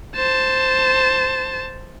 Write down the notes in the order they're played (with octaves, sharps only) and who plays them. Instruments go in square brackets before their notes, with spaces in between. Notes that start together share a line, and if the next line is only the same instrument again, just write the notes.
[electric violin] C5 A5